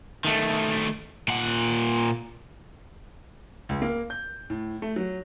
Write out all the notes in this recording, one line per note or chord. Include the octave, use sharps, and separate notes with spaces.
D#3 A3
A#2 F#5
C#2
A#3
G6
A2
A3
F#3